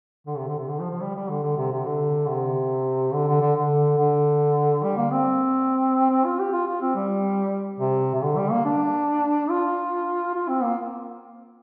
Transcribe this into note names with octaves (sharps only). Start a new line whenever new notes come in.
D3
C3
D3
C3
D3
F3
F3
G3
G3
D3
D3
C3
C3
D3
C3
D3
D3
D3
D3
D3
G3
A#3
C4
C4
F4
G4
F4
F4
C4
G3
C3
C3
D3
G3
A#3
D4
F4
F4
C4
A#3